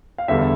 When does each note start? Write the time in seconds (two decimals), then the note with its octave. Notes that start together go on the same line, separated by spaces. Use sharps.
0.18 F5
0.28 E2 D3 G3 E5